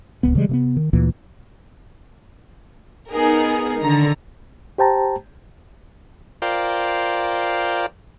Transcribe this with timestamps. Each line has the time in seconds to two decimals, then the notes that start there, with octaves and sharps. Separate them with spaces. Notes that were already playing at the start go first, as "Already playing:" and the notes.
0.23 D1 C#2 B3
0.35 C#3 E3 G3 G#3
0.49 C3 A3 B3
0.77 D#3
0.93 D2 A#2 E3 A#3
3.12 B3 D#4 G#4 A#4
3.82 D3 D#3 A#5
4.78 G4 C5 G5 A5 A#5
6.42 F4 A#4 C5 D5 G5